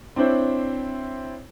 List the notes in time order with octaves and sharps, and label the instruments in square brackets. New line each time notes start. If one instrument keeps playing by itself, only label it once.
[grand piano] C4 D4 E4 C5 C#5